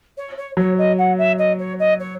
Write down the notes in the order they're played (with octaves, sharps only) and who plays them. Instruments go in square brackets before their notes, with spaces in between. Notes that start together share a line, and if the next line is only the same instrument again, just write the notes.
[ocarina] C#5
C#5
[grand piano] F#3 [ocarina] C#5
[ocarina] D#5
F#5
E5
D#5
C#5
D#5
C#5